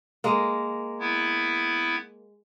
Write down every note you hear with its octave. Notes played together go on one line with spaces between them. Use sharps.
G#3 A#3
B3 E4